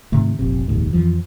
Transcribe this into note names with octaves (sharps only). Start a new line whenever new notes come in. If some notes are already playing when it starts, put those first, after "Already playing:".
G#2 C3 D#3 A3
F1 A#1 C3
F1 A#1 D#2 G#2
F2 E3 F3